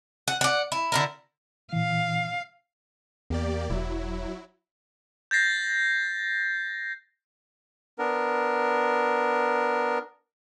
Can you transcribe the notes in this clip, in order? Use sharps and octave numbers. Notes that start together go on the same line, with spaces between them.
F#5
D5 F#5
E4
D3 E4 A#4
A#2 E3 F5
E2 A#3 G4 D5
E1 F#3 E4
G6 A6 A#6 C7
B3 D4 A#4